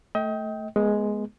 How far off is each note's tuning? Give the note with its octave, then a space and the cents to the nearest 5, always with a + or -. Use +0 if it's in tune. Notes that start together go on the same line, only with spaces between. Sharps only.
A3 +0 D#5 +35 G5 -5
G#3 +5 B3 -25